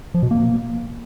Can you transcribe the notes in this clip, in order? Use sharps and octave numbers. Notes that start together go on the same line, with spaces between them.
F3
B2
A#3